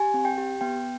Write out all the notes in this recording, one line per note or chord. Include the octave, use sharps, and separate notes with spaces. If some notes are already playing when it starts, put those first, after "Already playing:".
Already playing: G4 G#5
C4
G5
G4
B3 G5